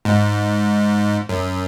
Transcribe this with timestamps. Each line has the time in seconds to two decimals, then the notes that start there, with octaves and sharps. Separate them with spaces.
0.05 G#2
1.29 F#2